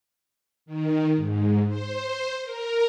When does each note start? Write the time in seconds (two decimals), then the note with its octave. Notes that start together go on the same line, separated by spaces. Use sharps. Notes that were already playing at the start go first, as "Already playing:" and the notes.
0.66 D#3
1.16 G#2
1.68 C5
2.43 A#4